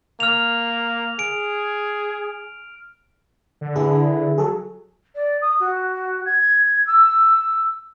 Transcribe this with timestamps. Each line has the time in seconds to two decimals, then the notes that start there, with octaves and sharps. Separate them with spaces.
0.20 A#3 F6 F7
1.19 G#4 D7
3.61 D3
3.76 E3 E4 G#4
4.38 F#3 G#4 A4
5.15 D5
5.42 D#6
5.60 F#4
6.26 G#6
6.87 E6